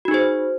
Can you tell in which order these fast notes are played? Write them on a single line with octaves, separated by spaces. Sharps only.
F#4 D#4 G#4 C5